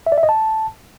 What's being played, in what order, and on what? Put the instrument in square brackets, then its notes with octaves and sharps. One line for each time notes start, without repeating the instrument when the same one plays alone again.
[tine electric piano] E5
D5
E5
D#5
A5